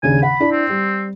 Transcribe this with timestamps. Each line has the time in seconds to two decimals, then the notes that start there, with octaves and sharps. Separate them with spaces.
0.03 D#2 C#3 D4 G#5
0.23 F#5 B5
0.40 D4 E4
0.52 C4
0.69 G3